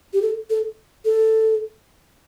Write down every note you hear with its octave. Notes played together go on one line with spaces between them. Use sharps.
G4
A4
A4
A4